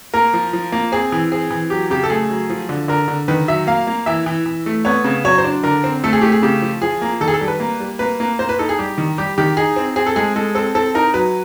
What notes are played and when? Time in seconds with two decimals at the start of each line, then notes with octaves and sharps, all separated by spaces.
0.14 A#3 A#4
0.33 F3
0.53 F3
0.72 A#3
0.92 C4 G#4
1.12 E3
1.32 C4 G#4
1.51 E3
1.70 F#3 G4
1.90 C#3 G4
2.04 A4
2.10 A3 G#4
2.30 F#3
2.50 F3
2.69 D3
2.88 D3 A#4
3.08 D3
3.28 D#3 B4
3.48 F#3 E5
3.67 A#3 F5
3.87 A#3
4.06 E3 E5
4.26 E3
4.46 E3
4.66 A3
4.85 B3 C#5
5.04 C#3
5.25 F#3 C#5
5.38 C5
5.44 D4
5.63 D3 A#4
5.84 C4
6.04 A3 A4
6.13 G#4
6.21 A3 G4
6.32 G#4
6.42 C#3 G4
6.62 F3
6.82 F3 G#4
7.02 A#3
7.21 D#3 A4
7.28 G#4
7.34 A4
7.41 G3
7.48 B4
7.60 A#3
7.80 G3
7.99 A#3 B4
8.20 A#3
8.39 A#3 C5
8.49 B4
8.59 D#4 A4
8.69 G#4
8.79 G3 G4
8.98 D#3
9.18 G3 G4
9.38 D#3 G4
9.57 D#4 G#4
9.76 C4
9.96 C4 G#4
10.07 A4
10.16 G#3 G#4
10.36 G#3 A4
10.55 C4 A4
10.75 C4 A4
10.95 D#4 A#4
11.14 F#3 B4